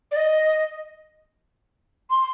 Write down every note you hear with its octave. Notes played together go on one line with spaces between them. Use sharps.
D5
D#5
C6